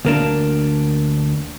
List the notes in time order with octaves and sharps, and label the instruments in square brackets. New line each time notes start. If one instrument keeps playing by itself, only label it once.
[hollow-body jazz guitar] D2 A#3 D4